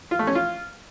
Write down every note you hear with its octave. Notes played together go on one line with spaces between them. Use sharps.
F4
A3
C#4
F4